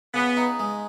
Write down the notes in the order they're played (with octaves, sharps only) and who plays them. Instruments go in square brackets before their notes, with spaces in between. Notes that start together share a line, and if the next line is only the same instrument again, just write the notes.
[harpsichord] C#3 [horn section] B3
[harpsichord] D#4
G#3